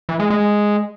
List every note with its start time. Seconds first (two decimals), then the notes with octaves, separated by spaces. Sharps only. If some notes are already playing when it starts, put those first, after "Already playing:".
0.09 E3
0.20 G#3
0.30 G#3